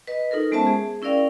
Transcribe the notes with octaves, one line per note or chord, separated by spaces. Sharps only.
B4 D#5
D#4 F4 A4 A#4
G#3 B3 C#4 C5 E5 A5
G#4
C#4 E4 A#4 D5 F5 G5